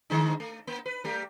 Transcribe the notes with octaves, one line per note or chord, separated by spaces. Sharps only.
D3 G#3 D#4
A3
A#3
B4
G3 A3 G4